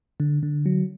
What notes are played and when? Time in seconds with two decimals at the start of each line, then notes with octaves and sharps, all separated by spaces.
0.20 D3
0.43 D3
0.66 F#3